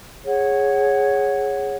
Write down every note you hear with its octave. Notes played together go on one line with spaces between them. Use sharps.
G#4 C#5 F#5